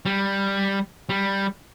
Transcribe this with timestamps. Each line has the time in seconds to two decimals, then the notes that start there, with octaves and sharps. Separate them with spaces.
0.06 G3
1.09 G3